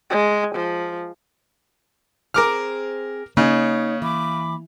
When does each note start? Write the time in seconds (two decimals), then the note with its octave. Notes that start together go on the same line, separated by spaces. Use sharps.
0.11 G#3
0.55 F3
2.34 C4 G#4 A#4 C5 D6 F6
3.37 C#3 A#3 D#4 C#5
4.02 E3 B5 D6